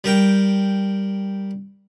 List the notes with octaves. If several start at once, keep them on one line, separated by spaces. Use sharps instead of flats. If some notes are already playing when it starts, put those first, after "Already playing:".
G3 A#4 G5